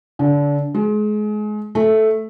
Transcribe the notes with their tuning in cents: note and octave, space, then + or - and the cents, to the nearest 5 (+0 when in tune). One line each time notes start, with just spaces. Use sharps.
D3 -25
G#3 +30
A3 -5